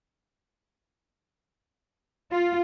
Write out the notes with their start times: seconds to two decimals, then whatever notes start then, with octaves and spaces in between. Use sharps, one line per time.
2.32 F4